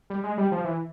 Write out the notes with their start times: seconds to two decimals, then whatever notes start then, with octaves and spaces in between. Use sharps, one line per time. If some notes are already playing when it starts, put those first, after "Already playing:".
0.10 G3
0.24 G#3
0.38 G3
0.52 F3
0.64 E3